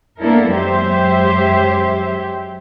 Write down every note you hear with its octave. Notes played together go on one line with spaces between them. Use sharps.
A#3 B3 D4 E4 A4 A#4
F#2 F#3 G#3 G4 C5 E5